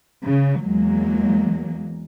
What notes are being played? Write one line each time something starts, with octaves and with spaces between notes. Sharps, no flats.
C#3
E2 F#3 G#3 A#3